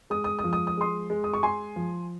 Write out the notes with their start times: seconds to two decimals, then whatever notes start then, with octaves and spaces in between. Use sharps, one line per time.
0.10 G#3 D#6
0.24 D#6
0.39 D#6
0.44 F3
0.53 D#6
0.67 D#6
0.77 G#3 C6 D#6
1.10 G#3
1.24 D#6
1.34 C#6
1.43 G#3 G#5 C6
1.76 F3